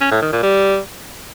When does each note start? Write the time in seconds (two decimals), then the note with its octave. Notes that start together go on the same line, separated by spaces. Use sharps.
0.01 C#4
0.12 A2
0.22 D#3
0.32 A#2
0.43 G3